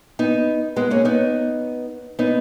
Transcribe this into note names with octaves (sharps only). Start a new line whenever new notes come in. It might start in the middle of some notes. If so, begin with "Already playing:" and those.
B3 D#4
G#3 B3
A#3 C#4
B3 D#4
B3 D#4